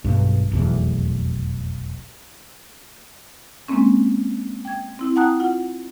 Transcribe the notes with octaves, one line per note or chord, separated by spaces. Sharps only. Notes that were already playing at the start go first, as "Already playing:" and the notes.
B1 G2
F1 B1 E2
G#3 A#3 C4 C#4
G5 G#6
C4 E4
F#5 G5 A5 A#5 D#6 F#6
F4 F#5